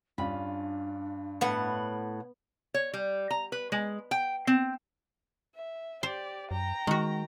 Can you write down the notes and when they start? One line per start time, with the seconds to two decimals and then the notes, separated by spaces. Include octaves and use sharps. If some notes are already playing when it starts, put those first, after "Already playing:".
0.18 G2 C#4 D4 F4 B5
1.41 A2 B3 F#5
2.74 C#5
2.94 G3
3.31 A#5
3.52 B4
3.72 G#3
4.11 G5
4.47 C4
5.55 E5
6.03 G4 C5 D5
6.51 F#2 G5 A#5
6.87 D#3 G#3 F#4